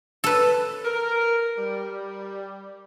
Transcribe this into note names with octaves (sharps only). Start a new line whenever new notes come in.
A4 B4
A#4
G3